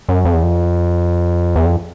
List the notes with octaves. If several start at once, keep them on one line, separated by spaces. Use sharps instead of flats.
F#2
F2
E2
F2
E2
F2